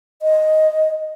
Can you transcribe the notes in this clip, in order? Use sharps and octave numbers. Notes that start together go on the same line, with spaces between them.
D#5